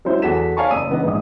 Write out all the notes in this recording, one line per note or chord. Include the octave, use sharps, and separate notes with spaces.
F#3 G#3 C#4 D4 E4 C5
E2 F#4 G#4 A4 B6 E7
C#5 D5 F5 G#5 A5 C#6
F#1 D#6 E6 D#7
C#3 E3 B3 D4 D#5
A#1 G#2 D#6